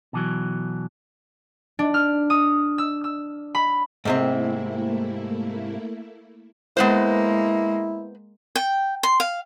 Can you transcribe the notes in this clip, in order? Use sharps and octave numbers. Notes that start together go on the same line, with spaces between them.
B2 E3 F#3
D4
F6
D#6
E6
E6
B5
G#2 C3 A3 A#3 C4 E4
G#3 A#3 B3 E4 B4 C5
G5
C6
F5